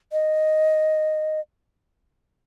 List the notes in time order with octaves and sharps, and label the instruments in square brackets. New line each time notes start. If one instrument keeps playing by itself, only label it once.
[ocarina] D#5